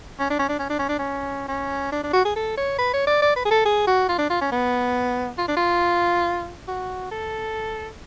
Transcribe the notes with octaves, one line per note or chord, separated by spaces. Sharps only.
C#4
D4
C#4
D4
C#4
D4
C#4
D4
C#4
C#4
D4
D4
F#4
G#4
A4
C#5
B4
C#5
D5
D5
B4
G#4
A4
G#4
F#4
F4
D4
F4
C#4
B3
F4
D4
F4
F#4
A4